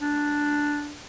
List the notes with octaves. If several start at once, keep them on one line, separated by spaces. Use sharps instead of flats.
D4